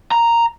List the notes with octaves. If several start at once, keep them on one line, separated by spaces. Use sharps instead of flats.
A#5